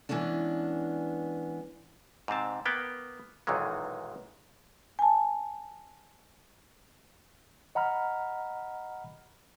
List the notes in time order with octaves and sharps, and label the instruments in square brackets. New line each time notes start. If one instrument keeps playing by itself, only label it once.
[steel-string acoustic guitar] E3 G#3 B3 C#4 D4
[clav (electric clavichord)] G#2 C3 C4 A5
A#3 B3 G5
B1 F#2 A#2 D#3 E3 G#3
[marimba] G#5 A5
[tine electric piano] D#5 F#5 A#5 B5 F6